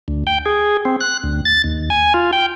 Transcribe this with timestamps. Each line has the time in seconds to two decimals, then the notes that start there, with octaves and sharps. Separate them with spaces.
0.08 D2
0.27 G5
0.46 G#4
0.85 C4
1.01 F#6
1.24 D2
1.45 A6
1.64 D#2
1.90 G#5
2.14 F4
2.33 G5